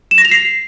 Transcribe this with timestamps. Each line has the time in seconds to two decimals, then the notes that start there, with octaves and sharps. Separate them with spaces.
0.11 E7
0.18 A#6
0.25 F7
0.31 C7